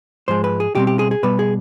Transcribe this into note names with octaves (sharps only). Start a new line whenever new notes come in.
G#2 F3 G#3 C5
B4
G#4
B2 G3 C4 G4
G4
G#4
G#4
B2 G3 B3 B4
G#4